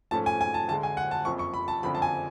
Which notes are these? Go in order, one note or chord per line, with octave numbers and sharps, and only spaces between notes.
G#2 F3 A3 C#4 A5
G#5
G#5
A5
D2 D3 G#3 A5
G#5
F#5
A5
F#1 F2 F3 C#6
C#6
B5
A5
F#1 F2 D3 F3 B5
A5
G#5